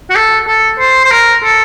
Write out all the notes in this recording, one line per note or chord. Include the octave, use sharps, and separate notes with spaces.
F#4
A4
A4
C5
C5
A#4
A4